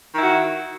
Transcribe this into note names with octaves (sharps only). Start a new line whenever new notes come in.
D#3 E4 F#4